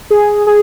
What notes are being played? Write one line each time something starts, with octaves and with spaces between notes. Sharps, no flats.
G#4
G#4